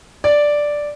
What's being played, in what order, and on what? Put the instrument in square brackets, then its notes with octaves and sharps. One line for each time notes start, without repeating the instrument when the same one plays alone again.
[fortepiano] D5